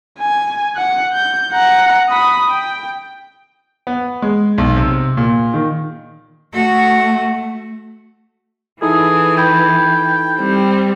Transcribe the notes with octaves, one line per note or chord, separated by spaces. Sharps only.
G#5
F#5 F#6
G6
F#5 A#5
B5 D#6
G5
B3
G#3
B1
C3
A#2
D#3
A3 F#4
E3 D#4 E4 G#4 A4
G5 B5 G#6
G3 C4